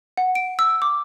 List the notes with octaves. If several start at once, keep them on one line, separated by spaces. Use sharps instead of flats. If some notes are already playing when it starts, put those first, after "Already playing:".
F#5
D7
E6
D6